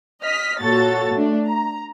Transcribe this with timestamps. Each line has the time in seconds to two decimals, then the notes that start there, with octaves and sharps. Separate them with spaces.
0.23 D#5 F6 B6
0.61 A#2 F#4 A4 C#5 A6
1.15 A3 D4
1.45 A#5